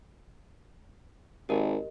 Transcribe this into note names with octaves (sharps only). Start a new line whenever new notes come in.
G#1 G4 A#4 D#5